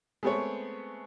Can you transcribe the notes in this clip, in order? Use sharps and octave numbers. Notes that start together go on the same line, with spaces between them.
G#3 A3 B3 C4 G#4 C#5